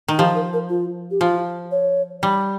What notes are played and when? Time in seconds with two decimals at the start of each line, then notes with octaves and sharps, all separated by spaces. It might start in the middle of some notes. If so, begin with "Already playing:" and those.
0.08 D#3
0.18 F3 G4
0.35 A#4
0.53 A#4
0.69 F4
1.11 G4
1.20 F3 F4
1.71 C#5
2.23 G3